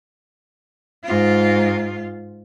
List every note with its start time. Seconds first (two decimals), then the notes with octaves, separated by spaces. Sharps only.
1.04 G#2 F4